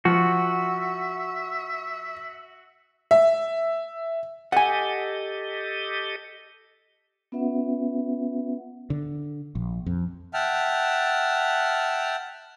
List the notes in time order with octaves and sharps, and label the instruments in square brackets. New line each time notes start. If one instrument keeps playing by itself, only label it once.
[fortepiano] F3 [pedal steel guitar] F#4 [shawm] E5
[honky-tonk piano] E5
[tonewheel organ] G4 A4 D#5 [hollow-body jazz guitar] F#5 G#5
[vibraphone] B3 C#4 F4 B4 E5 F#5
[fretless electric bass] D3
A#1
F2
[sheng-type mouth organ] E5 F#5 G5 A5 F6